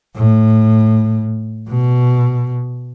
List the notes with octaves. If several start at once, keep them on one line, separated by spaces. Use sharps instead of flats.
A2
B2